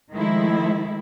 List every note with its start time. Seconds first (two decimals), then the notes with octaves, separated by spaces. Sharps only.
0.12 D#3 F3 G#3 A3 E4